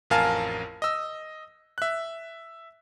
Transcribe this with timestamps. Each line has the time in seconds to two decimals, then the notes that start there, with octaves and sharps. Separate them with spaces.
0.10 A1 F2 A#4 F5 G#5 A5
0.82 D#5 E6
1.78 E5 F#6